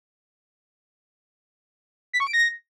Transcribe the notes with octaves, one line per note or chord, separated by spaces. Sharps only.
B6
C#6
D7
A#6